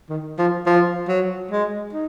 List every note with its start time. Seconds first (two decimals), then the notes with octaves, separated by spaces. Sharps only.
0.10 D#3
0.39 F3
0.66 F3
1.08 F#3
1.51 G#3
1.93 D#4